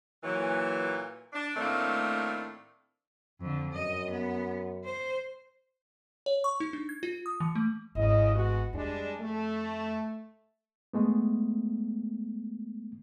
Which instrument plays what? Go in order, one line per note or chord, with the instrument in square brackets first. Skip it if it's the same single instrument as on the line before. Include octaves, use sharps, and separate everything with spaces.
[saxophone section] A#2 E3 F#3
D4
A2 D#3 A3 A#3 C4 D4
[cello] F2 D3
[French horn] F#2 [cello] D#5
[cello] B3
C5
[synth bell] C#5
C#6
D#4
D4
G#6
F4
D#6
E3
A3
[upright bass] G#1 [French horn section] C#3 E4 D#5
[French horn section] G#3 B3 F#4
[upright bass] F2 [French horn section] G3 G#3 D4
[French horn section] A3
[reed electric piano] G#3 A3 B3